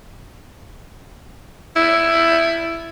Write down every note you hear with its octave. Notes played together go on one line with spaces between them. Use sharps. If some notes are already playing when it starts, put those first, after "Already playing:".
E4